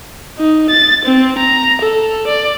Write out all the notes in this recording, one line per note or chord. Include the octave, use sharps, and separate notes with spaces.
D#4
A6
C4
A#5
A4
D5